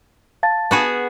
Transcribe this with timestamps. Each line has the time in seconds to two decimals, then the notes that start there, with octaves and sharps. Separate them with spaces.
0.43 F5 A5 A6
0.71 B3 F#4 G#4